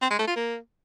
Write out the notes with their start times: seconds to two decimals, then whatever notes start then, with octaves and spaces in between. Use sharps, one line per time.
0.02 C4
0.10 G#3
0.19 A3
0.27 F4
0.36 A#3